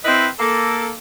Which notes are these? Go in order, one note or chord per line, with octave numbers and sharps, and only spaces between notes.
C4 E4 B4 D#5
A#3 A4